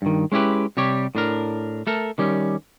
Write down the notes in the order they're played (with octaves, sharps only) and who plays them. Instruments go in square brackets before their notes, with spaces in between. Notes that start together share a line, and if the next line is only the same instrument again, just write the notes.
[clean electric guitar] G2 D#3
G#3 C#4 E4 G4 B4
C3 G3 G4 C#5
A2 D4 A#4
A3 A4 A#4
D#3 G3 C#4